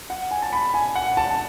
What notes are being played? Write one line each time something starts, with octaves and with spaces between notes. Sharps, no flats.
F#5
G#5
A5
B5
G#5
F#5
A5